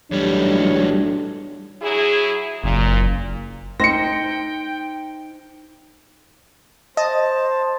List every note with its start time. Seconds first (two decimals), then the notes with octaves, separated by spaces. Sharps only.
0.11 B1 E2 A2 F#3 G3 D4 C#5
1.82 F#3 E4 G#4
2.63 F#1 A#2
3.80 D#4 C5 G5 A#6 C#7
6.97 C5 D#5 A5